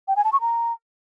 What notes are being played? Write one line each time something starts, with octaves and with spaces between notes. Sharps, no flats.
G5
G#5
A5
C#6
A#5